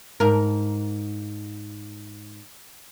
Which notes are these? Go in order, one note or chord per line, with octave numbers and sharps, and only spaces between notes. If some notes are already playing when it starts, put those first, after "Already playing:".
G#2 A#4